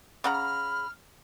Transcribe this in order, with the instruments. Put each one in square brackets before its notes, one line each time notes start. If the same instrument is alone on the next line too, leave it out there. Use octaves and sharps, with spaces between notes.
[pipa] C#3 F#5 A#5 [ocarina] B5 [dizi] F6